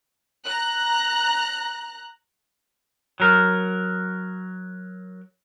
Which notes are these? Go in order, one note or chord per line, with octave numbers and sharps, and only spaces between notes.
A#5 F#6
F#3 A#4